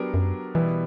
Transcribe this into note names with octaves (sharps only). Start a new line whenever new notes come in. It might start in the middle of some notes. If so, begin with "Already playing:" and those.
Already playing: F#3 B3 D4 G4 A#4
F#2
B2 E3 G3 B3 E4